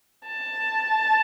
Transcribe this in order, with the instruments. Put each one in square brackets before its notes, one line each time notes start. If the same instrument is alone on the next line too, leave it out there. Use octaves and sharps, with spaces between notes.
[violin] A5